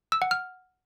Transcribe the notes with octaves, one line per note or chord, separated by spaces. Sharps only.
E6
F#5
F6